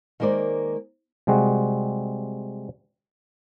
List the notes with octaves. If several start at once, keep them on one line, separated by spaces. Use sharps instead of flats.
D#3 G#3 A#3 C5 D5
C3 G3 G#3 C4 F#4